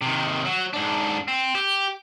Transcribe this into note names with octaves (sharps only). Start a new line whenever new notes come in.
C3 D#3
F#3
G#2 D4
C4
G4